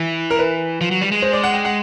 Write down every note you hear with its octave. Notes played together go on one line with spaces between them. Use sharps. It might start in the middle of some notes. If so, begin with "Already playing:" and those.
Already playing: E3
A#4
B4
F3
F#3
G3
G#3
C5
D5
F#5
G5
F#5